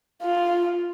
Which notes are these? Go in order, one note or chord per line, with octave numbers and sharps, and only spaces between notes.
F4